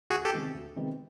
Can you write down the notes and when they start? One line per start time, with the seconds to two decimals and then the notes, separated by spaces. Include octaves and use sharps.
0.10 D2 F#4 G#4
0.25 G4 A4
0.33 C3 D#3 G#3 B3
0.54 D2
0.76 C3 D#3 G#3 B3